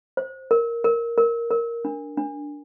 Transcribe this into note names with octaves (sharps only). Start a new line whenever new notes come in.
C5
A#4
A#4
A#4
A#4
D4
D4